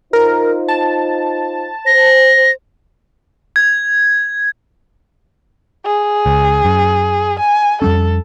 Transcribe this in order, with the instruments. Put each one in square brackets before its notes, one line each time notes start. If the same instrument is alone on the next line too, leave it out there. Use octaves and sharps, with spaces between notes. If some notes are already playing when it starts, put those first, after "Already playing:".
[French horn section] D#4 F4 C5 [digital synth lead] A#4
[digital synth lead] A5
[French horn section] C5 [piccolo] A#6
[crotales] G#6
[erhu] G#4
[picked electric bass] C#2
F#2
[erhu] G#5
[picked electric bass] F2 G3 C#4 [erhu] A4